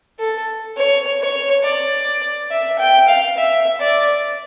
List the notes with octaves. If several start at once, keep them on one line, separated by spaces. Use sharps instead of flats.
A4
C#5
C#5
D5
E5
G5
F5
E5
D5